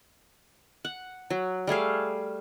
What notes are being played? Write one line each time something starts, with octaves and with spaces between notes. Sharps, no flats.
F#5
F#3
G3 A3 G#4 F5